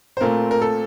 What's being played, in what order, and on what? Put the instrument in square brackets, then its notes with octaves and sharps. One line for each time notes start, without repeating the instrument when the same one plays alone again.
[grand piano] C5
[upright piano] A#2 A3 C4 F4 [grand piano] A#4
[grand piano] A#4
A4